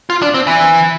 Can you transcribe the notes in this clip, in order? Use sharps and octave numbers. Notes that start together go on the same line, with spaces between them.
F4
D4
C4
E3